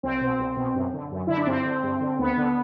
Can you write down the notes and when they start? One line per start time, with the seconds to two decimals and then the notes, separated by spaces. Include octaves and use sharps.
0.03 C2 C4
0.21 B2
0.39 C2
0.57 B2
0.74 F#2
0.93 D3
1.11 F#2
1.27 D3 E4
1.37 D4
1.47 G2 C4
1.65 D3
1.83 G2
2.01 D3
2.19 D2 B3
2.37 D3